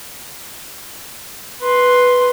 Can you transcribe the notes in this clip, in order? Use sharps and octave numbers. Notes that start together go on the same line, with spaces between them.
B4 C6